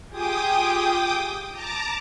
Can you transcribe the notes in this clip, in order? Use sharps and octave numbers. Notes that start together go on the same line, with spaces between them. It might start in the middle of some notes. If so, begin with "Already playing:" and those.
F4 G4 G#4 G5 D6 D#6
A5 A#5 D6